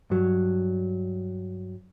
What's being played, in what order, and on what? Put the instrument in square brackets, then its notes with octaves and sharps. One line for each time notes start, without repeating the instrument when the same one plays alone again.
[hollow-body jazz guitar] G2 F#3